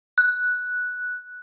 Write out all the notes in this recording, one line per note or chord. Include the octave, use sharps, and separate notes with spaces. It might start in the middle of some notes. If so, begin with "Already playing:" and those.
F#6